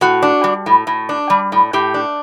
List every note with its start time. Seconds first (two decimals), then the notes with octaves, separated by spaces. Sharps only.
0.01 A2 F#4
0.22 D4
0.44 G3
0.66 A2
0.87 A2
1.09 D4
1.30 G3
1.52 A2
1.73 A2 G4
1.94 D4